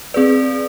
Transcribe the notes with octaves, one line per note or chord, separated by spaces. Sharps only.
C4 G#4 B4 D5